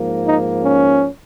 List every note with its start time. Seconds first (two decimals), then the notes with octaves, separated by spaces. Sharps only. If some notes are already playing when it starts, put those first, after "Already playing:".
Already playing: G#2 F3 A#3
0.25 D#4
0.63 C#4